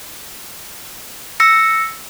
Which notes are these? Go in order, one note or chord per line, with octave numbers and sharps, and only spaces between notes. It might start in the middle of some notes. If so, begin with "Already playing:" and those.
E6 A#6 C#7